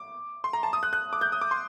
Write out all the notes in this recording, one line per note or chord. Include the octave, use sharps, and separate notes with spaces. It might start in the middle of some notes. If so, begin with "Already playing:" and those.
Already playing: D6
C6
A#5
A5
D#6
F#6
F#6
D6
G6
D#6
D6
C6